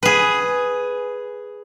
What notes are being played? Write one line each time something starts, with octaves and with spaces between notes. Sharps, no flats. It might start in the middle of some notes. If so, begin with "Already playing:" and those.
G#4 B4